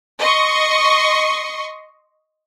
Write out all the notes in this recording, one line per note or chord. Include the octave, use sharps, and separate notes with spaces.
D#5 C6 C#6